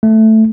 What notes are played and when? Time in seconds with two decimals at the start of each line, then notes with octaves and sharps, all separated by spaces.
0.03 A3